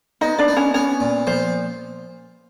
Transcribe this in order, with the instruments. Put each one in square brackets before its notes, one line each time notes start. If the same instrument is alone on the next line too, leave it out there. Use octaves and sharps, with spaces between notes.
[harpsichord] B3 [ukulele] D#4 D#5
[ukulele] D4 D5
[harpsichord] B3
[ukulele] C#4 C#5
[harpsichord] B3 [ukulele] C#4 C#5
[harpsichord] A#2
[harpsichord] F3 [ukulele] C5